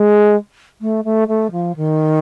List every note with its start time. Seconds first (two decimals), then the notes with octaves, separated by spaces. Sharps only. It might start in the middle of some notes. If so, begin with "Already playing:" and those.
Already playing: G#3
0.81 A3
1.04 A3
1.28 A3
1.51 F3
1.76 D#3